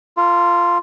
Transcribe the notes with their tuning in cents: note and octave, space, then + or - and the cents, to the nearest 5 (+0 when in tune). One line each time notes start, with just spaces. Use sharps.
F4 -5 A#4 -45